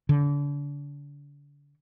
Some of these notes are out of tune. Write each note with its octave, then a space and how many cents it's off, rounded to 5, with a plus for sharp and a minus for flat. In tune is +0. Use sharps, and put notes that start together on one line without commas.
D3 -35